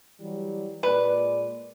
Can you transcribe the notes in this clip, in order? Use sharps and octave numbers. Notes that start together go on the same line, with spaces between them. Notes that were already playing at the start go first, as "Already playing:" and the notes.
E3 F#3 G3
A#2 G#3 B4 D5